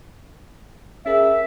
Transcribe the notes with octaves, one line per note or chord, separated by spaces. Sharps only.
C#4 G#4 A#4 E5